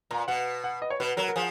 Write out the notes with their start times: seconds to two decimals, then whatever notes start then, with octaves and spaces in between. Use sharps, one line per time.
0.11 A#2 A#5
0.28 B2 F#5
0.64 F#5
0.82 D#5
0.90 C#5
1.00 B2 B4
1.17 F#3 A#4
1.28 A#4
1.36 F3 G#4